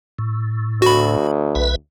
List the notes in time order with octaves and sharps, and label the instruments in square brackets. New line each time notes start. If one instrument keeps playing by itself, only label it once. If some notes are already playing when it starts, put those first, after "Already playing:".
[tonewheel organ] A2
[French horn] D2 [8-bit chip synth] F#4 B5
[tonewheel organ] B1 B4 E5